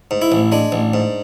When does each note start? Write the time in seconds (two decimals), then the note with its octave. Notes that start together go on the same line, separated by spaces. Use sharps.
0.11 G#2
0.22 E4
0.32 A1
0.52 G#3 D4
0.72 A1
0.94 G#2